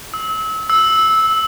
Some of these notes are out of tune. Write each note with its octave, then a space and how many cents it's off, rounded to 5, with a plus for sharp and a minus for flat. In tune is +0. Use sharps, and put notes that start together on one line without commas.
E6 -35
E6 -15